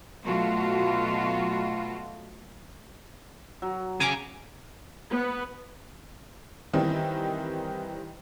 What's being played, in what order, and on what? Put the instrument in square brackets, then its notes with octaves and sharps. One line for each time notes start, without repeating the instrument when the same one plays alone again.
[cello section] B2 F#3 A3 F4 F#4
[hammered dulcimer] F#3
[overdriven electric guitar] C#3 G#4 [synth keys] G#5 A#5 D6
[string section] B3
[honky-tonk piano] D#3 E3 G3 C4 D#4